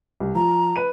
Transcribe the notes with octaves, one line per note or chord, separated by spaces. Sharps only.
C2
F3 A#5
B4 D#7